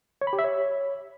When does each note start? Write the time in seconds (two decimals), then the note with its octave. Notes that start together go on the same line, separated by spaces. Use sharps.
0.21 C#5
0.27 B5
0.33 G4
0.39 E5
0.44 C#5